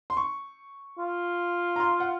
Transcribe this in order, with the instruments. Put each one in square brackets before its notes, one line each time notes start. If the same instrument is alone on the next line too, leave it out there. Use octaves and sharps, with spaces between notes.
[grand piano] C6
C#6
[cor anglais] F4
[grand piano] A#5
C6
F#5